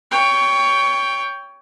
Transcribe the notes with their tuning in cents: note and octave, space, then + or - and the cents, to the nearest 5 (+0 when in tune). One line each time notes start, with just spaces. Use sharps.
C#5 +20 G5 +10